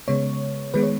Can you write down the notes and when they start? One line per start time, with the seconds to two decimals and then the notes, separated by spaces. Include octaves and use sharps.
0.08 C#3 G#3 B3 C#5
0.74 D#3 G#3 B3 B4
0.83 C#5